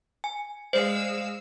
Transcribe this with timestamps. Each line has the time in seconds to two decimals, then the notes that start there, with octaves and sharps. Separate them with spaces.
0.24 G#5
0.73 G#3 C5 D5 F5 E6 C7